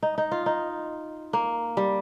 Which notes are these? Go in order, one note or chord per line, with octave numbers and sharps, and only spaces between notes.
D#4
D#4
F4
D#4
A#3
G3